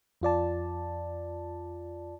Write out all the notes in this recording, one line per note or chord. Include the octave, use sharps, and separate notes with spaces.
F2 F4 D5 A5